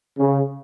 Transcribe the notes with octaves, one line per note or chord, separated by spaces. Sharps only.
C#3